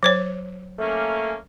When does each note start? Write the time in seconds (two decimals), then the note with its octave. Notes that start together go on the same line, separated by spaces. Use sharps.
0.03 F#3 C5 C#5
0.79 A3 A#3 C#4